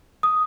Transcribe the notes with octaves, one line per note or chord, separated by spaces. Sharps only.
D#6